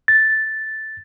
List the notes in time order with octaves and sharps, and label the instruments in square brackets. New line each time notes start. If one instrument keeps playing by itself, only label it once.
[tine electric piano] A6